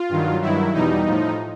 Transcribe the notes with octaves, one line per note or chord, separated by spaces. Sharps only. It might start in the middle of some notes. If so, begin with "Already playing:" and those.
Already playing: F4
G2 D#3 F#3
G2 D#3 F#3 E4
E2 B2 G3 D#4
A2 F3